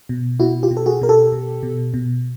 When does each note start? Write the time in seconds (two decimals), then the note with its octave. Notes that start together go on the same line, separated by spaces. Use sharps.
0.09 B2
0.40 B2 E4 F#4
0.63 F4 G4
0.71 B2
0.77 A4
0.86 F#4 G#4
1.01 B2 A#4
1.09 G4 A4
1.32 B2
1.63 B2
1.94 B2